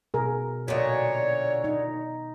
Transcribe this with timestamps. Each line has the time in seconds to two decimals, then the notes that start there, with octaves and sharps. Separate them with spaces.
0.14 B2 G#4 A#4
0.68 A#2 D3 F#4 C#5 D#5
1.64 D#4